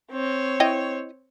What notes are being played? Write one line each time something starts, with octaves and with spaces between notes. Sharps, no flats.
C4 C#5
E4 D#5 G5